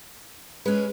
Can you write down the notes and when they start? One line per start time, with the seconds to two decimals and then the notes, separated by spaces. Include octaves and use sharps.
0.65 G#3 C#4 B4